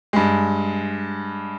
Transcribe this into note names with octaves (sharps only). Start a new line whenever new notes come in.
G2 G#3